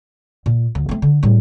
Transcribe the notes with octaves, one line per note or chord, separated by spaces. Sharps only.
A#2
D2
A3 C4
D3
A2 G3